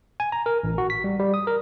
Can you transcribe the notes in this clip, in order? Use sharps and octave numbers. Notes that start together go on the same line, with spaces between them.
G#5
A#5
A#4
A1
F#4
B6
G3
G3
D#6
A#4